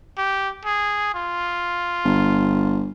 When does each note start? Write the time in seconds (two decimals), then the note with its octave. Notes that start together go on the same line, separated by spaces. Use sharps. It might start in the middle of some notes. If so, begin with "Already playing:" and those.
0.18 G4
0.65 G#4
1.14 F4
2.05 G1